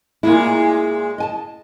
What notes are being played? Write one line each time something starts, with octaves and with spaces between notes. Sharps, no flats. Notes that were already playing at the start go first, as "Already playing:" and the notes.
A#2 G#3 A#3 E4
D#5 G#5 A5